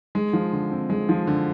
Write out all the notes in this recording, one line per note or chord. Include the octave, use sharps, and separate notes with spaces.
G#3
F3
D3
C4
G#3
F3
D3